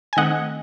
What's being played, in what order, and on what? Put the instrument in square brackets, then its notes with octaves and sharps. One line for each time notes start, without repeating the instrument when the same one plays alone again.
[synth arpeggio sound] G#5
D#3 A3 C4 D#5 F#5